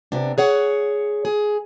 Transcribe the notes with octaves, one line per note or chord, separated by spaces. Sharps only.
C3 B3 D4
G#4 C#5 F#5
G#4